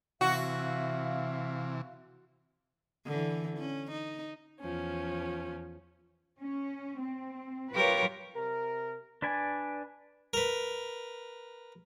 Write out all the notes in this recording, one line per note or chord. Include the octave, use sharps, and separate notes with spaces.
C3 E3 F#4 E5 F5
D3 E3
C#4
D#4
E2 F3 C#4
C#4
C4
F#3 F4 G4 A#4 B4 C#5
C3 A#4
D4 B4 D5 G#5
A#4 B4